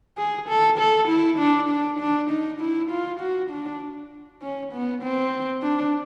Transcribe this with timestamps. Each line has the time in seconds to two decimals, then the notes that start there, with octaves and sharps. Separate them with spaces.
0.18 G#4
0.49 A4
0.79 A4
1.09 E4
1.39 D4
1.69 D4
2.00 D4
2.30 D#4
2.60 E4
2.91 F4
3.20 F#4
3.51 D4
4.42 C#4
4.73 B3
5.03 C4
5.63 D4